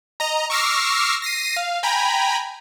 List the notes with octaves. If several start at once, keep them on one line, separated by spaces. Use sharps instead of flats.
D#5 A#5
C#6 D6 E6 F6 A#6 C7
A#6 C7 D#7
F5
G5 G#5 A#5 B5